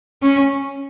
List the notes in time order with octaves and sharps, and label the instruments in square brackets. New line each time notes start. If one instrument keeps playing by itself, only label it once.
[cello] C#4